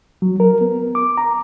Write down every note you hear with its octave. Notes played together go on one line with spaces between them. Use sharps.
F#3
A#4
B3
D6
A#5